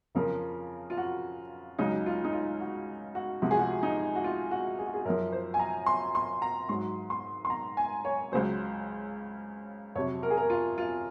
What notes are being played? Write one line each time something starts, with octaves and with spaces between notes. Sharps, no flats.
F2 C#3 F3 A#4
F4
F#4
C#2 C#3 F#3 D#4
F4
D#4
F4
F#4
F#4
C#2 C3 F3 F#4
G#4
F#4
D#4
F#4
F4
F#4
G#4
F#4
G#4
F#2 F3 A#4
C5
G#5
A#5
C6
C6
A#5
G#2 F#3 C6
C6
C6
A#5
G#5
C#5
C#2 C#3 F#3 C5
F2 C3 F#3 C#5
A#4
G#4
A#4
F4
F4